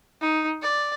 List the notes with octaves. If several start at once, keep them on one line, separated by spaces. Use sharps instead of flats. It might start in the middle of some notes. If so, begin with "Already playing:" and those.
D#4
D5